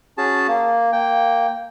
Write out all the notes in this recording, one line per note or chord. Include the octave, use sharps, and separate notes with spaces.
C#4 F#4 G#4 A5
A#3
A#3 G5